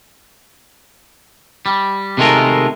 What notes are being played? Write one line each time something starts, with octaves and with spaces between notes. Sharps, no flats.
G3
C3 D#3 G#3 A3 F4 A#4